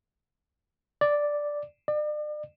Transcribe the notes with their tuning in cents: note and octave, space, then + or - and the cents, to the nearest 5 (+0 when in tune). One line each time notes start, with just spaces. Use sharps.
D5 +0
D5 +40